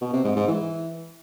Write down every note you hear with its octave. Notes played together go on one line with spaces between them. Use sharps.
B2
C3
G#2
G#2
E3